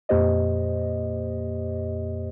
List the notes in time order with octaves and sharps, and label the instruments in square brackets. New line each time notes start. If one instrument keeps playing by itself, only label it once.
[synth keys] F2 A#2 A#3 G4 C5 D#5